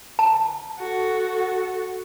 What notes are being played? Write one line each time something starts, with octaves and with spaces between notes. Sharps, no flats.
A5
F#4 A4